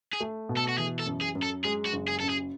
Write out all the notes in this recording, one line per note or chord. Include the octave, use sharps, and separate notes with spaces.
G#4
A3
B2
A4
F#4
E3 G#4
A4
F#2
G#4
F#2
A4
G#3 G#4
F#4
F#1
G#4
F#2 A4
G#4